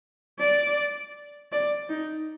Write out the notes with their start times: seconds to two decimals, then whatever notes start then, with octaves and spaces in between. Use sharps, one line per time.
0.39 D5
1.52 D5
1.89 D#4